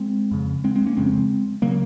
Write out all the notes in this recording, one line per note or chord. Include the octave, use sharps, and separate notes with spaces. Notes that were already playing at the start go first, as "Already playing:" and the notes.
Already playing: G#3 C4
F2 C#3
G#3 C4
G#3 C4
A#3 C#4
F2 C#3 G#3 C4
C#3 F#3 A#3